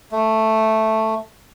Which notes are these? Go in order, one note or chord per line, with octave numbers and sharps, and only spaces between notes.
A3